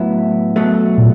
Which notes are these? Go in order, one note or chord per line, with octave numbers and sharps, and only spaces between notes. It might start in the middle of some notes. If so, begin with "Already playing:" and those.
Already playing: A2 F#3 B3 E4
B2 F#3 A3
A#2